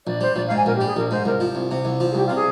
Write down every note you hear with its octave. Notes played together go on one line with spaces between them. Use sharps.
A#1 D5
G3 C5
A#1 D5
G#2 F5
G#5
A#1 A#4
G4
G3
G#4
A#1 A#4
G#2 C5
C2 A#4
F3
C2
C3
C2
F3
G#4
C2 G4
F4
C3
G#4